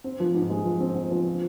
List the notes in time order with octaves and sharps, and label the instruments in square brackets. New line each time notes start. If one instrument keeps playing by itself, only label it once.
[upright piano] C4
F3
G#2
G#3
F3
C4
C4
F3
F4